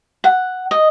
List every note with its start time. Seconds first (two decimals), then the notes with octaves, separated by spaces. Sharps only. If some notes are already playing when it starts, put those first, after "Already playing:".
0.24 F#5
0.71 D#5